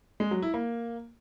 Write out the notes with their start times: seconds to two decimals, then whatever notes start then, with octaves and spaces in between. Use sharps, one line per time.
0.20 G#3
0.31 F#3
0.42 E4
0.54 A#3